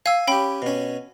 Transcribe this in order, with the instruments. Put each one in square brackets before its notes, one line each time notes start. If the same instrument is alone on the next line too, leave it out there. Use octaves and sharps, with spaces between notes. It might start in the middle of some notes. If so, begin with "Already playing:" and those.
[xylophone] F5 E6 [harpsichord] G#5
[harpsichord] C#4 G4 [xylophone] G5 B5
[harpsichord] B2 C#4